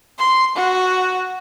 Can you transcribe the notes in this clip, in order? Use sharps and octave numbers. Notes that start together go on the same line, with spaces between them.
C6
F#4